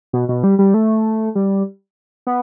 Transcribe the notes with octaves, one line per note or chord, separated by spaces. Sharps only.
B2
B2
G3
G3
A3
G3
B3